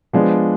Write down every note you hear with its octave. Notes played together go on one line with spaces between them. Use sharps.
F3 G#3 B3 D4